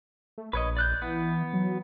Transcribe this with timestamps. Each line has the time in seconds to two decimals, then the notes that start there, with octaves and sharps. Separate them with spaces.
0.38 A3
0.53 A#1 B4 C#5 D#5
0.77 D5 F#6 G6
1.02 E3 B3
1.53 F#3